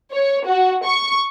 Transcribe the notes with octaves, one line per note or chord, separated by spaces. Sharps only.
C#5
F#4
C#6